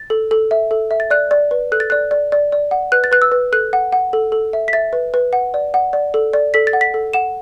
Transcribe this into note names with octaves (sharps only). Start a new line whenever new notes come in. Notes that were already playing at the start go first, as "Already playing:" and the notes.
Already playing: A6
A4
A4
E5
A4
E5
A6
D5 F#6
D5
B4
A4 F#6
A6
D5 F#6
D5
D5
D5
F#5
B4 F#6
A6
B4 F#6
E6
B4
A4 F#6
F#5
F#5
A4
A4
E5
B6
E5 A6
B4
B4
F#5
D5
F#5
D5
A4
D5
A4 B6
A6
F#5
B6
A4
F#5 E7